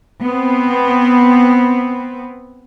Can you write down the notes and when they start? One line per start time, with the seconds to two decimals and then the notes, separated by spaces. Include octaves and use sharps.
0.22 B3 C4